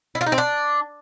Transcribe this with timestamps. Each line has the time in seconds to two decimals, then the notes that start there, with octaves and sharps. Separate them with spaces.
0.15 E4
0.21 F4
0.26 D#4
0.32 C4
0.38 D4